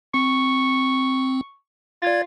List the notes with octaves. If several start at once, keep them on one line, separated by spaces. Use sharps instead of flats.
C4 C#6
F4 D5 G#6 A6